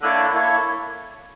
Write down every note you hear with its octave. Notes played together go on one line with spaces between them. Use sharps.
D3 A#3 E4 A4 C#5
A#3 E4 A4 C#5